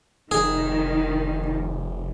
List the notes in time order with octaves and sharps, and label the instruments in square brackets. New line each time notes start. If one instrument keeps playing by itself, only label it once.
[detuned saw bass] F1 [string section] D#3 [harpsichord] G#4